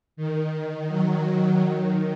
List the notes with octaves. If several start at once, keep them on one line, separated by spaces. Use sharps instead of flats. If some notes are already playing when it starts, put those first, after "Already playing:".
D#3
F#3
F#3
D#3